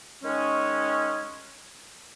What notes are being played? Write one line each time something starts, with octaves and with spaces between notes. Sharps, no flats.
D#3 G#3 C#4